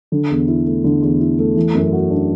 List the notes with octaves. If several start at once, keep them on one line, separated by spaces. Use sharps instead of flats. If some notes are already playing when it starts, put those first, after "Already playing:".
D3
E2
E4
A3
D3
E2
E4
A3
E3
F#2
F#4
D4